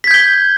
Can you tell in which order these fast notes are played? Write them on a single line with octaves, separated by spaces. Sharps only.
B6 G#6 G6 G7